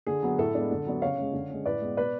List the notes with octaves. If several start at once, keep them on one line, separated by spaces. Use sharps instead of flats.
D3 G#4
F#3 B3
A2 A4
G#3 B3 D4
D3
F#3 B3 D4
C#3 C#5 F5
G#3 C#4
D3
G#3 C#4
A2 B4 D5
G#3 B3
B2 B4 D5